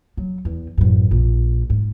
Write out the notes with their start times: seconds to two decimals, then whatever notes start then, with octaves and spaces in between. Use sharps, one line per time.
0.17 F#3
0.45 E2
0.77 A1 F#2
1.11 A#1
1.70 G#2